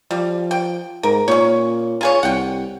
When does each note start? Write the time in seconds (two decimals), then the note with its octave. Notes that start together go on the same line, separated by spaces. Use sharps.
0.11 F3 G3
0.51 G5
1.03 G#2 A#4
1.28 A#2 C#4 C#5
2.01 F4 G#4 C#5
2.23 C2 F#5 G5